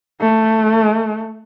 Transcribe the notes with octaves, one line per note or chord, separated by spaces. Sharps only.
A3